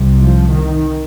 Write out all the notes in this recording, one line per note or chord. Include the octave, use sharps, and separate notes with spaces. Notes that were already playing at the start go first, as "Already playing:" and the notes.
Already playing: C2 C3
F3
D#3